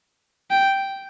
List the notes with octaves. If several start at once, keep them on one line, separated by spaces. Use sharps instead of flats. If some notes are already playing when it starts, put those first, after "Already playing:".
G5